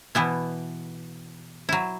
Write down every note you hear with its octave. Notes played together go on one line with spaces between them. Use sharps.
B2 E3 B3 E4
F#3 E4